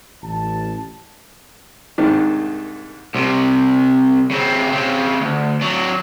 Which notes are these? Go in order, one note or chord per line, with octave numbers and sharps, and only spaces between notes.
A1 A5
C2 G#2 D#3 D4
C2 C3
C#3 C4
C#3 C4
D2
F#3 D4